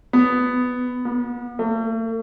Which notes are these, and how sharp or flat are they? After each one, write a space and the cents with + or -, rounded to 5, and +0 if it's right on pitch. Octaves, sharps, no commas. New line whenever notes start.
B3 +10
B3 -35
A3 +45